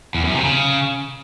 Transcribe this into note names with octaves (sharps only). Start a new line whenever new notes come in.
E2
F#2
C3
C#3